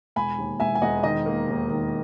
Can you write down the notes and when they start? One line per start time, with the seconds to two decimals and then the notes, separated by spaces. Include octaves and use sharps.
0.16 E1 G#5 B5
0.38 D#2
0.60 E1 E5 G#5
0.75 G#5
0.82 E1 D#5 F#5
1.04 D#3 D#5
1.26 A#3
1.48 D#2
1.70 D#3